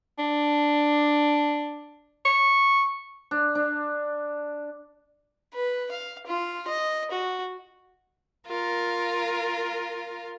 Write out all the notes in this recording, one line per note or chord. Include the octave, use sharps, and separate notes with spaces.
D4
C#6
D4
D4
B4
F5
F4
D#5
F#4
F4 A#4